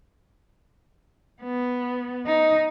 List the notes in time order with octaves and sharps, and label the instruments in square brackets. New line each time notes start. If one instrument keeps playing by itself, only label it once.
[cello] B3
D#4